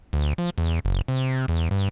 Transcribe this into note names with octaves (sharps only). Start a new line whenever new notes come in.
D2
F3
E2
F#1
C3
E2
G2